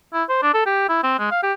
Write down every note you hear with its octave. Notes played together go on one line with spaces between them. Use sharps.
E4
C5
D4
A4
G4
E4
C4
G#3
F5
G4